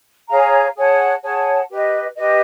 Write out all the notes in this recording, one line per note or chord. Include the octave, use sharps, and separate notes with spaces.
G#4 C#5 F5 A#5
G#4 C#5 F#5 A5
G#4 C#5 F#5 A5
G4 B4 D#5
G4 B4 D#5